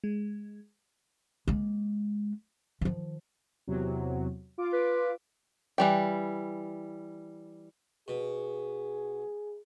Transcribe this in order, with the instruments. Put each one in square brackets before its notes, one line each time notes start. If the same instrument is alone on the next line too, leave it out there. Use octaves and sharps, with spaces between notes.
[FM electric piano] G#3
[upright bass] G#3 A#3
D#3 F3
[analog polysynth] E2 C3 F#3
F4 D6
[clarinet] B4
[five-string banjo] E3 G3 G5
[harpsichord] B2 [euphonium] G#4